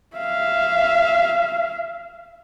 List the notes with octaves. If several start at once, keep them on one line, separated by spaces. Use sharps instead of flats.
E5 F5